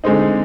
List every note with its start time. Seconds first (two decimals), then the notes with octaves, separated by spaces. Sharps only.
0.04 D3 G#3 C4 D#4